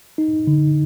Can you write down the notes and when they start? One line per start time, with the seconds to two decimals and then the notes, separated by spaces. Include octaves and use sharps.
0.18 D#4
0.47 D3